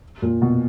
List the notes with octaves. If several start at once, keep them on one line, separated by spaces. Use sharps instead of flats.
A#2
B2